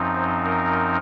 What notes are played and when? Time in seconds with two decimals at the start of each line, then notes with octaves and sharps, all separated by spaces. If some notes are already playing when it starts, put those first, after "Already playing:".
Already playing: F#2 F3 C4 D#4
0.14 C5
0.44 A#4